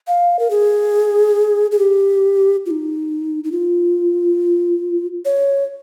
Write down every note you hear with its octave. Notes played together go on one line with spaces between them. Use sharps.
F5
A#4
G#4
G#4
G4
F4
D#4
D#4
F4
C#5